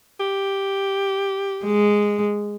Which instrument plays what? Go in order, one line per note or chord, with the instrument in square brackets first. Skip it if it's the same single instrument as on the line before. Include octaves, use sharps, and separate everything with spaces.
[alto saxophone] G4
[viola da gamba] G#3